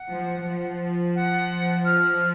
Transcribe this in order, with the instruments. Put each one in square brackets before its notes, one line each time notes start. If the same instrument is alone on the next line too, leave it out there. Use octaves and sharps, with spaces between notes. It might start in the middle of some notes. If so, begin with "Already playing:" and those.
Already playing: [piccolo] F#5
[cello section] F3
F3
[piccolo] F#5
F6